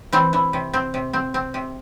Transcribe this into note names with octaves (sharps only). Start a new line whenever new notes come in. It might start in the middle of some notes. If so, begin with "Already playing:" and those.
E3 C4
E3
C3
C4
C3
C4
C4
C3